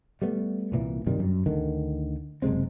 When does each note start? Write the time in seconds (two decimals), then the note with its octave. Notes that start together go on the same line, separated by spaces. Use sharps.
0.22 G3 A3 B3
0.72 C2 A#2 E3
1.06 G2 C3 D#3 G3
1.19 F#2
1.46 D2 D3 D#3
2.42 F#1 C3 G#3 C4